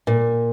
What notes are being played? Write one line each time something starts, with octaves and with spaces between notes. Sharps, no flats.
A#2